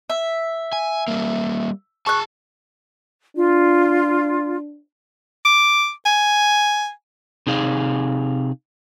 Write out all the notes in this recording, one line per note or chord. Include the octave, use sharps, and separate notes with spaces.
E5
G#5
G3 A#3
G#4 A5 C#6 F#6
D4 F4
D6
G#5
C3 D#4 G#4 F5